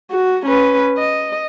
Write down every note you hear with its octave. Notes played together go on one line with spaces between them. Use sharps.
F#4
C#4 B4
D#5